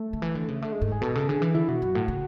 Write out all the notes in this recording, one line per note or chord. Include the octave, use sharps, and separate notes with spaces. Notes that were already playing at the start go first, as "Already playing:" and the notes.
Already playing: A3
D3
E3
D3
C#3
D3 A3
G#3
G#2 A3
G#4
B2 A4
C#3 A4
D3 G#4
E3
D3 E4
B2 F#4
F#2
A2
C#3